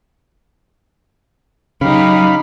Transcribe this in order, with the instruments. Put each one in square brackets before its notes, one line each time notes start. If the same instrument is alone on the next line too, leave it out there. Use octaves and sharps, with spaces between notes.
[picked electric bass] C#3 [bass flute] F#3 [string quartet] D#4 G4 [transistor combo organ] F5 B5